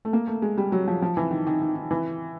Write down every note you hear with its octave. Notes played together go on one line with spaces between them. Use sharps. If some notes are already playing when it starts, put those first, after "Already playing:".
A3
A#3
A3
G#3
G3
F#3
F3
F3
E3
D#3
D#3
D#3
D#3
E3